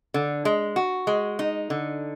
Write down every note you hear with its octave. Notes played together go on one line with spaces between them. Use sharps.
D3
G#3
F#4
G#3
D#4
D3